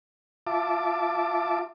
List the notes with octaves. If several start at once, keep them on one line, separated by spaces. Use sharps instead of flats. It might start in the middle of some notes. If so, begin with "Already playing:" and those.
F4 E5 A5 D6